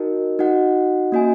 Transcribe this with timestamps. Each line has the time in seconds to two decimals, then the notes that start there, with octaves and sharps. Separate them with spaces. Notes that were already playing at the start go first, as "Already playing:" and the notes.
Already playing: D#4 F#4 A#4 D#5
0.39 D#4 F#4 D#5 F#5
1.12 A#3 C#4 F#4 D#5 G#5